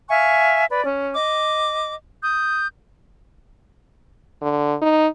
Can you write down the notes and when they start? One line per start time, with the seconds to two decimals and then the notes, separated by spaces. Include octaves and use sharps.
0.09 E5 F5 G#5 C#6
0.69 B4 D5
0.85 C#4
1.15 D#5 D6
2.22 D#6 G6
4.42 D3
4.82 D#4